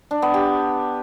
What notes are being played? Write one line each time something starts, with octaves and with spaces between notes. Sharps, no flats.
D4
B3
G4